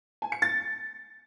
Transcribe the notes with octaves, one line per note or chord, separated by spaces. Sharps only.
G#5
C#7
A6